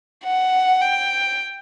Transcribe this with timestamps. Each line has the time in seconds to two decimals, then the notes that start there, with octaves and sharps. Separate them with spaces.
0.25 F#5
0.81 G5